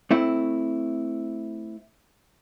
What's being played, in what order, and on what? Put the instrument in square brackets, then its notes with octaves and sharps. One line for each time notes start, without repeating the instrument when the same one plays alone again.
[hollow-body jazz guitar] A3 C4 E4